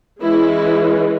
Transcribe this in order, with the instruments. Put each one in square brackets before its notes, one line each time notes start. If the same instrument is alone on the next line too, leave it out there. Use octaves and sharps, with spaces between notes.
[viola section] E3 G#3 C#4 E4